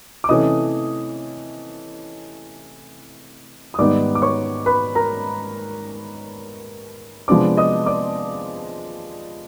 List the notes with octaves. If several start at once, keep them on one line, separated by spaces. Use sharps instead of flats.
D6
C3 E3 A3 C#4 D#5 D#6
D#6
G#2 D#3 G3 B3 D#4 D5 D6
D6
C#5 C#6
B4 B5
A#4 A#5
C3 F3 G#3 B3 D4 D5 D6
D#5 D#6
D5 D6